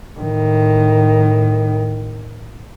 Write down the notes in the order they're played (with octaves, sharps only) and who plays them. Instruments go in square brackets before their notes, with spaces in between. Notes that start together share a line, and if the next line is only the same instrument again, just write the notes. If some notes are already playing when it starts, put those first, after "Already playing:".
[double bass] A2 D#3